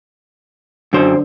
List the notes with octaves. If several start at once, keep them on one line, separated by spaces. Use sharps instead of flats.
F#2 D3 C5